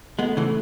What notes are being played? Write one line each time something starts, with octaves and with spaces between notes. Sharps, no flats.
G#3 A3 B3
C#3 E3